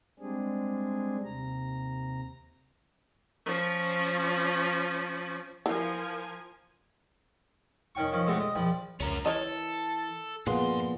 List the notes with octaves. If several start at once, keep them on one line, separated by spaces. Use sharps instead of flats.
G3 G#3 C4 D4 G#4
D#2 C3 A#5
F3 C#4
E3 F3 A#4 G#5
D#3 C#4 G5 C#6
D#3 F3 C#4
D3 G#3 A3 F#4 G4
D#5
A#1 F3 G5 B5
C#2 C#4 A#4
E3 A4 A#4 C#5 D#5
G2 A#2 F3 B3 F4 G#4 C6